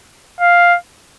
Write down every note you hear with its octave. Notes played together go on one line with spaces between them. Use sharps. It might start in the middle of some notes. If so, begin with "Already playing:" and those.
F5